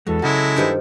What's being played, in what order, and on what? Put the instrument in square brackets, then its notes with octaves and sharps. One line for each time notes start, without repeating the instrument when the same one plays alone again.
[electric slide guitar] E2 E3 G#3 [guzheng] F#4 [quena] A4
[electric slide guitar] C#3 F#4 [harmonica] F#3 G#3 E4 [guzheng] A5
[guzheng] G2 D#3 F3